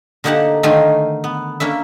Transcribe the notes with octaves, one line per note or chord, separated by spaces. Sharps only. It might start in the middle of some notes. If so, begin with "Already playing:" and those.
D3 A#3 D#4 G4 F#5 A5
D3 D#3 A3 D#4 F4 G#5
B3
A#3 C#4 D4 E5